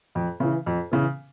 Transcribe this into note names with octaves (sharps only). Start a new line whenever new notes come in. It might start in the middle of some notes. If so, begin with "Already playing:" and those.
F2
C#3 E3
F2
C#3 E3